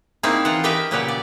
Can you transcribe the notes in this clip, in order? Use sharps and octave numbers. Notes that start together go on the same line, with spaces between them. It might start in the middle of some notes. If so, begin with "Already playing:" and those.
A#3 C4 C#4 D#4 E4 G#4
E3 F4 F#5
G4 A#4 B4 D#5 E5 G5
A#2 C#3 F#3 G4 B4 F#5
D5